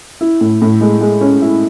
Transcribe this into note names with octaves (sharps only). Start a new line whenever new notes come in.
E4
A2
A2
G#3
G#3
C#4
E4